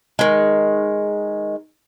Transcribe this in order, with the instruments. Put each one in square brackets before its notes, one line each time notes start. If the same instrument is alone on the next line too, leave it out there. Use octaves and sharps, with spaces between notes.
[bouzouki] D#3 G#3